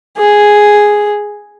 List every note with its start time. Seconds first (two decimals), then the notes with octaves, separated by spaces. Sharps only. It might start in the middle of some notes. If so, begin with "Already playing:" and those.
0.18 G#4